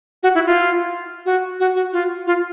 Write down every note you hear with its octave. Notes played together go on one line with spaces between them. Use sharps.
F#4
E4
F4
F#4
F#4
F#4
F4
F4